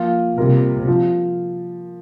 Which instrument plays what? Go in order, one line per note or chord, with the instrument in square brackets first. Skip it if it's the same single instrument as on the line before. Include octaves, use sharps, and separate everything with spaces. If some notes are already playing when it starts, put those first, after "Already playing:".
Already playing: [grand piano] F3 A#3 F4
[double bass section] C3 [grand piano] G3 A#3 F4 A#4
[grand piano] F3